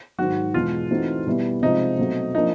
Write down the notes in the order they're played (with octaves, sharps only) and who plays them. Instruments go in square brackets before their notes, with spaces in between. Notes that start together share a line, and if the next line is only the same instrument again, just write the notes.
[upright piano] G#2 D#3 F#3 [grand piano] F#4
[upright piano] E2 B2 G#3 [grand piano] F4
[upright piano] E3 A3 C4 D#4 F#4
B2 G3 B3 E4
[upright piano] C3 F3 G#3 C4 F4 [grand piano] D#4
[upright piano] B2 F#3 A3 C4
[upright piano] F3 A#3 D4 F4 [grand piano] D#4